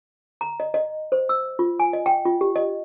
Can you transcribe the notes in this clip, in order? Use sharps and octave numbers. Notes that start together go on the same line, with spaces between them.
A#5
D#5
D#5
C5
E6
F4
G#5
D#5
G5
F4
G4
D#5